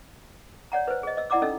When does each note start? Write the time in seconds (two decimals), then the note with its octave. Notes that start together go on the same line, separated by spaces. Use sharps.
0.72 C#5 D5 F#5 A#5
0.88 B4 C5
1.03 G#4 D#5
1.17 D#5 E6
1.30 E4 D5 F#5 A#5 D6 E6
1.42 C#4 D#4 A4 D#5 E6